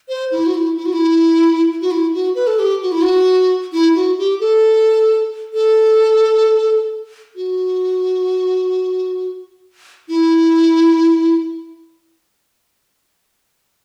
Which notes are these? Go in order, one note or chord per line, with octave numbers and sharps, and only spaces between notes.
C5
E4
F#4
E4
E4
F#4
E4
F#4
E4
F#4
B4
A4
G4
F#4
E4
F#4
E4
F#4
G4
A4
A4
F#4
E4